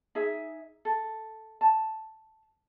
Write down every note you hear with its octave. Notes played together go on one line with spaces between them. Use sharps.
D#4 G#4 E5
A4
A5